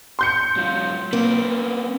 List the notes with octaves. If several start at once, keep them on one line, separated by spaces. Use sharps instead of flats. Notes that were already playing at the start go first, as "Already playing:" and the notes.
C6 G6 C#7
G#2 F#3 F4
A#3 C4 C#4 B4